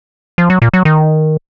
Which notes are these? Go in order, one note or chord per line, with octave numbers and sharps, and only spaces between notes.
F3
F#3
A#2
F#3
D#3